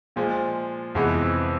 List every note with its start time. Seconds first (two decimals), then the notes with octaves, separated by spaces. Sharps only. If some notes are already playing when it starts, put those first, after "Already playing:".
0.16 A#2 F3 G#3
0.95 F2 C3 E3 G#3 B3